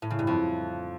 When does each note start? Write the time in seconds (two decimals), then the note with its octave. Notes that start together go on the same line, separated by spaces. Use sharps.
0.02 A2
0.10 C#3
0.19 G2
0.27 F2